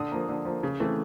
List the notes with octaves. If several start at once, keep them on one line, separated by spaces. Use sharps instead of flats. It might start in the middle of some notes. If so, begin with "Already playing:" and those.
Already playing: D3 D#6
F3 A#3
D3
F3 A#3
C#3
E3 A3 C4